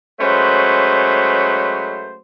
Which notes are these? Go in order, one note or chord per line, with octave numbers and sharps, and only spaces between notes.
F#3 G#3 A3 C#4 B4 C5